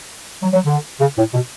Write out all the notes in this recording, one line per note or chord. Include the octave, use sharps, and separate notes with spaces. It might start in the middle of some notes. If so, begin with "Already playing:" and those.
F#3
F#3
D3
C#3
A2
B2